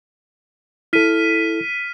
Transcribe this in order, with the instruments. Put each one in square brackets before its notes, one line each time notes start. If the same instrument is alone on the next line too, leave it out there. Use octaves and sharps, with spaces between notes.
[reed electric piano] E4 A4 [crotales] F6 B6 D#7